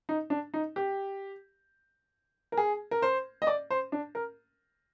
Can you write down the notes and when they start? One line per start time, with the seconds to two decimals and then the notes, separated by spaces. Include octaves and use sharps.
0.09 D#4
0.30 D4
0.54 D#4
0.76 G4
2.52 A#4
2.58 G#4
2.91 A#4
3.02 C5
3.42 D#5
3.47 D5
3.70 C5
3.92 D4
4.15 A#4